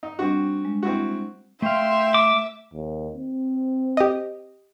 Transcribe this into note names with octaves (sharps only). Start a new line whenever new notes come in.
D#4
G3 C4 D4 F#4
G#3
C4 E4 F#4
A3 E5 F5 G5 C6
D6
D#2
C4
G4 D#5